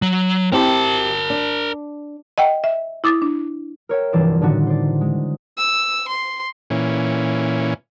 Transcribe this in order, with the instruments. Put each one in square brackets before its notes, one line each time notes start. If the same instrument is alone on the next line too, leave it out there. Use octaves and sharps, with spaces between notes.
[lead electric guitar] F#3
[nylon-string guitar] C4 E4 G4 [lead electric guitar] A#4 A5
[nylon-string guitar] D4
[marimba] D#5 F#5 G5
E5
E4 D6 D#6 A6
D4
[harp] A#4 C#5 E5 G5
F1 G2 E3 D5 C6 E7
A2 D3 D#3 D4 D#4 F#4
C5 D5
G#3
[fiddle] E6
C6
[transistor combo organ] A#2 E3 C#4